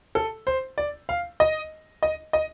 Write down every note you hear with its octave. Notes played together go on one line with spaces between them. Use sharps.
A4
C5
D5
F5
D#5
D#5
D#5